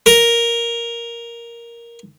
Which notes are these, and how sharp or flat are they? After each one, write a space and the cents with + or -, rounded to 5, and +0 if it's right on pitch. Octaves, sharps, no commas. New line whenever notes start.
A#4 +5